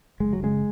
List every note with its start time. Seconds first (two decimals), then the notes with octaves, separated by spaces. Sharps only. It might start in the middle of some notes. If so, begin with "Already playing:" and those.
0.20 F#1 G#3
0.33 F#3
0.42 C#3 G#3